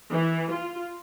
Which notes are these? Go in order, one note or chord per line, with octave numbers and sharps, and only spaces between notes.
E3
F4